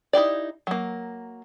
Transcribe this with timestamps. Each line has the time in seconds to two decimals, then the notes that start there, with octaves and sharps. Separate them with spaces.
0.13 D#4 E4 G4 D5
0.67 F#3 A#3